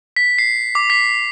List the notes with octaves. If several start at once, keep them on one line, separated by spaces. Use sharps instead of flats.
B6
C7
D6
B6